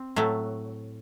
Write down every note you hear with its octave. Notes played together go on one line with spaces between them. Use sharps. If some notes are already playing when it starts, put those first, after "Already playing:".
Already playing: C4
A2 F#3 A3